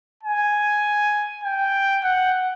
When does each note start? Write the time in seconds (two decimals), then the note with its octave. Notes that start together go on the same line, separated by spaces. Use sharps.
0.23 G#5
1.44 G5
2.04 F#5